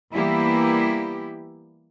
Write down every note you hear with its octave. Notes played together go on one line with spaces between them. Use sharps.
E3 G3 A#3 B3 E4 G4